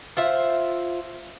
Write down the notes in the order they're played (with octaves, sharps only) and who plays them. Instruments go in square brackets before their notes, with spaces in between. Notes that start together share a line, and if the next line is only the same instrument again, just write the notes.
[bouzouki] F4 C5 E5